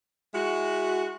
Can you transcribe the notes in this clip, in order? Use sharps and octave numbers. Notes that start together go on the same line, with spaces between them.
G#3 E4 F#4